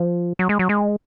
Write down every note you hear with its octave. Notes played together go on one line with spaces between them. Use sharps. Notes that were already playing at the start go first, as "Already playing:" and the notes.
Already playing: F3
F#3
G#3
F#3
G#3